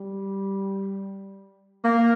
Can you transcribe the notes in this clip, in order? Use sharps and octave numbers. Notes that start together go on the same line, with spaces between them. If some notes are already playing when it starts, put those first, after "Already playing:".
Already playing: G3
A#3